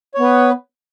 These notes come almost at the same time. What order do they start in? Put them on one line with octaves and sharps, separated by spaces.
C#5 B3 B4